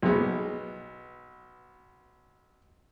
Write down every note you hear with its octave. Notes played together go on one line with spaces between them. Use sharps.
B1 G#3 B3